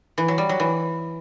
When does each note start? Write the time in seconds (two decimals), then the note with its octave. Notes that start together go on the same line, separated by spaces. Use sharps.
0.18 E3
0.28 F#3
0.38 G3
0.49 F#3
0.60 E3